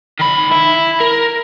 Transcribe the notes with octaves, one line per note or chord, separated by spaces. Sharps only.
D#3 B5
E4
A#4